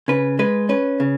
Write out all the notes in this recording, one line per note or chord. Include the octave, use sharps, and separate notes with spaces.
C#3 B4
G#3 B4
C#4 B4
C#3